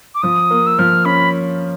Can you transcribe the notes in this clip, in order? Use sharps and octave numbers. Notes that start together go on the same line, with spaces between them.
D6
F3 D#6
A#3
E6
F3 F6
C#4 B5